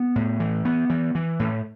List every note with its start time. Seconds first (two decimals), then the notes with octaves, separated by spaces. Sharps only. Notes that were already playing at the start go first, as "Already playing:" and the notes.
Already playing: B3
0.16 A2
0.40 E3
0.65 B3
0.90 E3
1.15 E3
1.40 A2